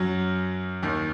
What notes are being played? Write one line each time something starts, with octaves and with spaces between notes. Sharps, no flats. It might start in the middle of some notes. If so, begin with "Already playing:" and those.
Already playing: F#2 F#3
D#2 D#3